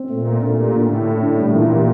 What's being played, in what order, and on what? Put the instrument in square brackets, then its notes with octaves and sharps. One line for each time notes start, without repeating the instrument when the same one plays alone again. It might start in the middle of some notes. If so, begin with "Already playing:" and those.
Already playing: [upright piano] C4
[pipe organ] A#2 [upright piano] A3
[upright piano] A3
[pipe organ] A#2 [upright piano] D4
[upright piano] G4
[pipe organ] A2 [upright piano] D3
[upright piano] D3
A4
D4
[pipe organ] A#2 [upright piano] G3
[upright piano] E3
G4